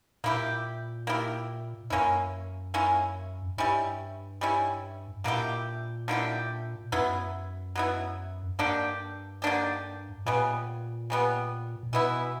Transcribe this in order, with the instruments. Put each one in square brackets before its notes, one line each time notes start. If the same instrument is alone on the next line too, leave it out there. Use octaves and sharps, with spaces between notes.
[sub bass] A#2 [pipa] A#3 E4 G4
[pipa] A#3 E4 G4
[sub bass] F#2 [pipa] A#3 C#4 E4
[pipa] A#3 C#4 E4
[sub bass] G2 [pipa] G3 C#4 E4
[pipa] G3 C#4 E4
[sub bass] A#2 [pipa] D3 A#3 E4 G4
[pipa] D3 A#3 E4 G4
[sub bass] F#2 [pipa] F#3 B3 E4
[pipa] F#3 B3 E4
[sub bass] G2 [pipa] D3 A#3 D4 G4
[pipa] D3 A#3 D4 G4
[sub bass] A#2 [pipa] C#3 G3 B3
[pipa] C#3 G3 B3
[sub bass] A#2
[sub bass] B2 [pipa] E3 B3 E4